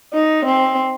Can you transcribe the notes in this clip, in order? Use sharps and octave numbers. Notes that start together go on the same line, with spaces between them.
D#4
C4